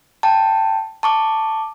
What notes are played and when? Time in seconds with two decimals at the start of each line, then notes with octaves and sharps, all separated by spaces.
0.23 G5 A5
1.03 A5 C#6 D6